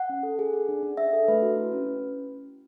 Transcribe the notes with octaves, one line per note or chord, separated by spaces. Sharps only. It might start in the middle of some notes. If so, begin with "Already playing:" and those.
Already playing: F#5
C#4
A4
G#4
G#4
D4
D4
D4 E5
A4
A3 B4
F#4
E4
C#4
C#4